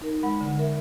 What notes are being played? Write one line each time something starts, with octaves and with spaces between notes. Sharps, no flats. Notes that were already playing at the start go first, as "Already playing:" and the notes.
D#4 A#4
G#3 F#5 B5
D3
A#4 E5